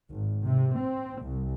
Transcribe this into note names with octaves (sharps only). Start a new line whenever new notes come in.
G#1
C3
C4
C2